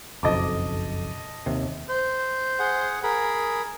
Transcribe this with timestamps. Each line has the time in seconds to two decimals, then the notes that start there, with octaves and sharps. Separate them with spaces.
0.23 F#1 B1 F2 D#5 A5 D6
1.46 D#2 C3
1.89 C5
2.59 G#4 F#5
3.03 G#4 A#4 B5